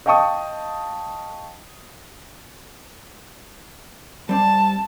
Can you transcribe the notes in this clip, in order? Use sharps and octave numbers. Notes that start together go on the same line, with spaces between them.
D#5 F5 G5 A5 C#6 D#6
G3 C4 D5 A5